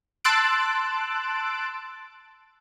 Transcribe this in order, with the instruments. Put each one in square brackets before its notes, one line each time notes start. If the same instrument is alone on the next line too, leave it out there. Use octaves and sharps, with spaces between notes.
[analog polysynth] A5 C6 E6 F#6 A6 D7